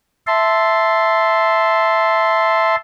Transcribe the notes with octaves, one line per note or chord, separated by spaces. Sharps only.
E5 A5 C6